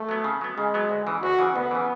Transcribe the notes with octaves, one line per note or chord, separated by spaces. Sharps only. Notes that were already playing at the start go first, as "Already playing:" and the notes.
Already playing: A3
F#3 B3
C#3
F#3 B3
C#3 G#3
F#3 B3
D2
C#3 E3
D2 F#4
C#3 E3
D2 B3
C#3 E3